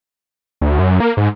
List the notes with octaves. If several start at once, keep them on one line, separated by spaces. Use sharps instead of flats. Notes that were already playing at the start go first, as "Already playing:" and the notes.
D2
F#2
A#3
G#2